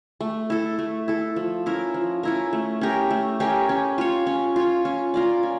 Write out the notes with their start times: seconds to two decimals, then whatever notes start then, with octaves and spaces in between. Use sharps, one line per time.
0.21 A3
0.50 E4 A4
0.79 A3
1.08 E4 A4
1.36 F3
1.66 C#4 E4 A#4
1.94 F3
2.23 C#4 E4 A#4
2.53 A3
2.81 C#4 G4 A#4
3.11 A3
3.40 C#4 G4 A#4
3.69 C#4
3.98 F4 C#5
4.27 C#4
4.56 F4 C#5
4.85 C#4
5.14 F4 A#4 D5
5.43 C#4